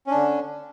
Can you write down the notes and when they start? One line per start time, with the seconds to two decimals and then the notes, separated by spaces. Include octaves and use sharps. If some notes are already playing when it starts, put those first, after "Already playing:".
0.07 C#4
0.11 D4
0.15 D3